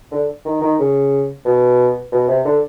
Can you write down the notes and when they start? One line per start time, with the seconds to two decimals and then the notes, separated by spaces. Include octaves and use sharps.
0.12 D3
0.45 D#3
0.61 D#3
0.79 C#3
1.45 B2
2.12 B2
2.28 C3
2.45 D3